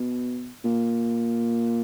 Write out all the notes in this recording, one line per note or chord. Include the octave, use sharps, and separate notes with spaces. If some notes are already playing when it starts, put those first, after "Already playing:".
Already playing: B2
A#2